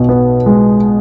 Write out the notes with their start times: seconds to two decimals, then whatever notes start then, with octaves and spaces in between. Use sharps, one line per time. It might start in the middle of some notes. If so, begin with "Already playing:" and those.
Already playing: B1 B2
0.09 B3
0.46 G#3